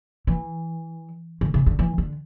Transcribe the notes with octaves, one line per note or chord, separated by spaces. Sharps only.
E3
D3
C#3
D3
E3
D3